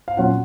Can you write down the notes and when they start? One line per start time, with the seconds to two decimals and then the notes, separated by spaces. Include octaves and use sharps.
0.08 F5
0.17 A#2 F#3 C#4 F4 F#5